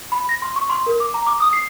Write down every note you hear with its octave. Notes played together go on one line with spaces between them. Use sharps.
B5
A#6
C6
C#6
C6
A#4
D6
A#5
D6
D#6
C7